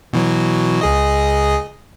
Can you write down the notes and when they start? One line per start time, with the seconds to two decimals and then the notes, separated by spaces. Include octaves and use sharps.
0.13 B2 E3 F#3
0.81 C#2 G#4 D#5